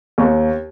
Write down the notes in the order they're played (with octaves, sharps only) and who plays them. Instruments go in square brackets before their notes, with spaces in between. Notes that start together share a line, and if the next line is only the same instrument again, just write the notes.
[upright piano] D#2